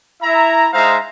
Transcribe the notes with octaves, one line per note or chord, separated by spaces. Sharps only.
E4 E5 A#5
G#3 D#4 C5 E5 F5 A#5